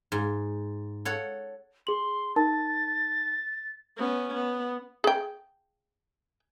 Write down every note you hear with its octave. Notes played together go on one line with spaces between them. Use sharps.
G#2
A4 C#5 F#5
G#4 C6 F#7
D#4 A#4 A5 A6
B3 C#4
B3
G#4 G5